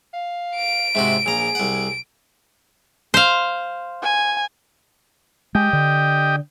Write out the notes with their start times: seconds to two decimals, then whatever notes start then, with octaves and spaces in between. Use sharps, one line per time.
0.14 F5
0.56 D7
0.95 G#2 C3 F#4 E5
1.26 A#1 G#4 A#5
1.55 C2 F#5
3.14 C5 F5
4.03 G#5
5.55 G#3 G4 D#5 G5
5.73 D3